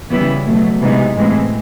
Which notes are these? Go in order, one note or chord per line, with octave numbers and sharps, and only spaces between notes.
C#3 E3 G3 B3 E4
B2 F#3 A3
C3 E3 G#3 B3 D#4
A2 E3 G#3 C4